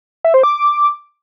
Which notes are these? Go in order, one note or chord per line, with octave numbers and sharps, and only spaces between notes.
E5
C5
D6